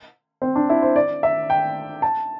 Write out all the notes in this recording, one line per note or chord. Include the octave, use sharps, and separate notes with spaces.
C4
D4
E4
C5
D5
E5
G5
A5